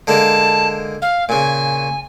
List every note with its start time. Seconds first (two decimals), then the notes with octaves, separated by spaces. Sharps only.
0.07 D3 G#3 A#3 A5
1.02 F5
1.29 A#2 C#3 G#5